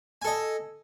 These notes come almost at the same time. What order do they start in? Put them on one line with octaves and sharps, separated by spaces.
G#5 A4 D#5